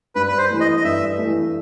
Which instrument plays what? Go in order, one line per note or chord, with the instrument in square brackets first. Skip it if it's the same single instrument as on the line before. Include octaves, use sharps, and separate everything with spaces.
[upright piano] G2 [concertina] B4
[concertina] B4
C5
[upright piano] E3 A3
[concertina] D#5
D#5
[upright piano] G2 [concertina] E5
[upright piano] E3 A3